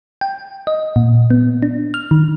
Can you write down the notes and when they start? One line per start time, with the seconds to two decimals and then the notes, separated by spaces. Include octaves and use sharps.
0.21 G5
0.67 D#5
0.96 A#2
1.30 B3
1.62 D4
1.94 F6
2.11 D#3